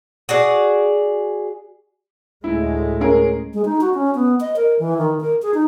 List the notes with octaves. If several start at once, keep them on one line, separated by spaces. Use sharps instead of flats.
F#4 G#4 D5
D2 A2 G#3 E4
C#4 G#4 A#4
G#3
D#4
F#4
C#4
B3
D#5
A#4
E3
D#3
A#4
G#4
D#4